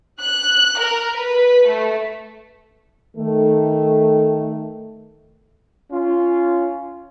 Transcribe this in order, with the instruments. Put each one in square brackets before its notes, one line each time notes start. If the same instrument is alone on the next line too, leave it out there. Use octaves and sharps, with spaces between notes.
[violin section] F#6
A#4
B4
A3
[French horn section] D#3 A3
[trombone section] C#4 F4